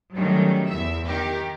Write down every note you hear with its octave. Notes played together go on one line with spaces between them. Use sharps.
D#3 F#3 G3 A3 C#4
E2 E5
D#3 G4 A#4